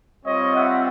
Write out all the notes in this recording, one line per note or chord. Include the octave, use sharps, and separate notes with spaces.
G3 C4 F4 C#5 D#5
E5 F#5